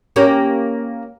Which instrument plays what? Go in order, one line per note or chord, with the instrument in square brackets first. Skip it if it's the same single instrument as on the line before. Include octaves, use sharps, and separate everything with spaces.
[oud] A#3 C#4 G4